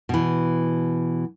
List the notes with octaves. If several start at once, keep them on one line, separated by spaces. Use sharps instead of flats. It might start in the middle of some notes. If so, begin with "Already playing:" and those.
B2 E3